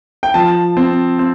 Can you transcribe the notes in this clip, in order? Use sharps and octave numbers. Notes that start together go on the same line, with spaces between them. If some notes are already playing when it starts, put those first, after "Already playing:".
G5
F3 A5
C4
C4